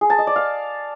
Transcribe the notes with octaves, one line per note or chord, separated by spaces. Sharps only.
G#4
A5
D#5
D5
F5